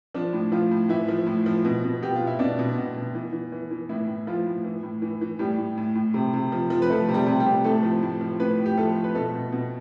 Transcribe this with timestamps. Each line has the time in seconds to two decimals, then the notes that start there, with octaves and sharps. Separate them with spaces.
0.14 F3 D4
0.33 A2
0.52 A2 F3 F4
0.71 A2
0.89 A2 E3 E4
1.08 F3
1.27 A2
1.46 F3
1.64 B2
1.84 B2
2.02 B2 G4
2.16 F4
2.21 B2
2.27 E4
2.39 B2 D4
2.59 B2
2.77 B2
2.96 B2
3.15 E3
3.33 E3
3.52 E3
3.71 E3
3.89 A2 E3 E4
4.08 A2
4.27 A2 F3 F4
4.46 A2
4.64 E3
4.83 A2
5.02 E3
5.21 E3
5.39 A2 G3 G4
5.58 A2
5.78 A2
5.95 A2
6.14 C3
6.33 C3
6.52 F3
6.70 F3
6.82 B4
6.90 F3 A3 A4
7.09 C3
7.14 G3 G4
7.27 C3
7.40 G3 G4
7.46 C3
7.64 A2 A3 A4
7.83 F3
8.03 A2
8.21 F3
8.40 A2 B3 B4
8.58 A2
8.66 G4
8.77 F3 A3 A4
8.95 F3
9.04 B4
9.14 B2 A3 A4
9.33 B2
9.52 B2